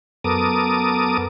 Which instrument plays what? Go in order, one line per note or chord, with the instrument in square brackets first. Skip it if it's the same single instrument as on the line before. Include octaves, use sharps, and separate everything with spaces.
[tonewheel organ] F#2 B3 A4 A#4 D6 D#6